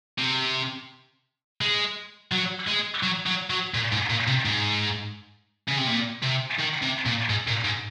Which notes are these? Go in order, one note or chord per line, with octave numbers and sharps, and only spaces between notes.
C3
G#3
F#3
G#3
F#3
F#3
F#3
A#2
G#2
A#2
C3
G#2
C#3
C3
A#2
C3
D#3
C3
A#2
G#2
A#2
G#2